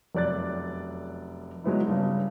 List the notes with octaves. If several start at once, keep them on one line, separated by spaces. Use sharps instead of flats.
F1 F#2 D5 F#6 A6
F#3 G#3 B3 E4
G2 C#3